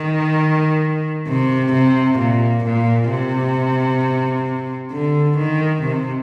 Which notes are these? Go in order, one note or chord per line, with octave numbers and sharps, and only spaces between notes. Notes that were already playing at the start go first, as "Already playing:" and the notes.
Already playing: D#3
C3
C3
A#2
A#2
C3
D3
D#3
C3